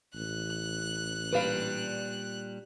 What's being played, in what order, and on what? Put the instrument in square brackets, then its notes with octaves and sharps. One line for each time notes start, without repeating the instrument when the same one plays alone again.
[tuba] A1 [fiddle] F#6
[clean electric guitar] A#2 G3 D4 [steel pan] B4 F5